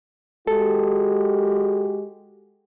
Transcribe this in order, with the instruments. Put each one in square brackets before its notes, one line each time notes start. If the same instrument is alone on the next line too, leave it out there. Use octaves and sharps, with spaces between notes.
[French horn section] G#3 F#4 G4 [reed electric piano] A4